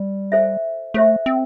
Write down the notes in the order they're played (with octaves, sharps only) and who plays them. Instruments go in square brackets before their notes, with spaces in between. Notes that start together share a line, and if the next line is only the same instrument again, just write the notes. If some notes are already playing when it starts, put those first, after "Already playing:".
Already playing: [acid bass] G3
[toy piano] A4 C5 E5
[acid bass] A3 [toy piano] A4 C5 E5
[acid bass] C4